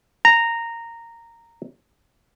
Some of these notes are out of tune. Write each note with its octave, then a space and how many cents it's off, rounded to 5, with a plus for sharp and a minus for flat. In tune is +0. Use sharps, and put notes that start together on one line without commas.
A#5 -10